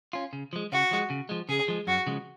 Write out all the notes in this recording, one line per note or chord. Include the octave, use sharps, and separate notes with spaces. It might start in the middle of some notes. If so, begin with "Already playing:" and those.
C#4 F4
C#3
F3 G#3
C#3 F#4
F3 G#3
C#3
F3 G#3
C#3 G#4
F3 G#3
F#2 F#4
C#3 F3 G#3